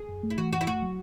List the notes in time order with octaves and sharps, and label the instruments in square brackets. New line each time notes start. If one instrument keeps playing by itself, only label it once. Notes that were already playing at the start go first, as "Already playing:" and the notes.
Already playing: [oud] G#4
[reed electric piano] F#2
A3
[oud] E4
[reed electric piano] E3 [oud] F#4
[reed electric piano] F#2 [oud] F#4
[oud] E4
[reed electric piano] A3 [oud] F#4
[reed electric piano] F#3